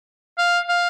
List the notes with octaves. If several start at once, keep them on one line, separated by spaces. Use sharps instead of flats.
F5
F5